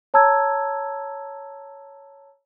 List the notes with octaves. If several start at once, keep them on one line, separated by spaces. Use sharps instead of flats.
C#5 A5 A#5 E6 G#6